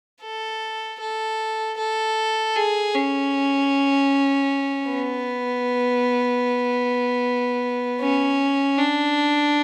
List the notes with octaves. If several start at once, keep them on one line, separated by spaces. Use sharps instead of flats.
A4
A4
A4
G#4
C#4
B3
C#4
D4